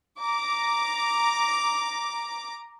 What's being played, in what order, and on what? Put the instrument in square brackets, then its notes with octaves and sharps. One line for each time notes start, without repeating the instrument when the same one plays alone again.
[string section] A#5 D6